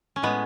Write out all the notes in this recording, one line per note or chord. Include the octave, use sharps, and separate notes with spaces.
C#4
A2 G#3 B3